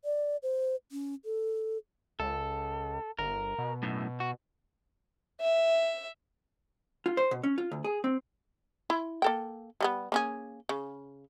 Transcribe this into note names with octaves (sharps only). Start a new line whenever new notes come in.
D5
C5
C#4
A4
C#2 A4
G1 A#4
B2
F#2 A2
F#4
E5
F4
C5
B2
C#4
F4
D2
G#4
C4
E4
A#3 A4 G5
G3 A#3 B3
A#3 C#4 G#4
C#3